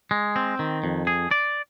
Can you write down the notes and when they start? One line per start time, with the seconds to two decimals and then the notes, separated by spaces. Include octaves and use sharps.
0.11 G#3
0.36 C4
0.59 D#3
0.84 F2
1.07 G#4
1.31 D5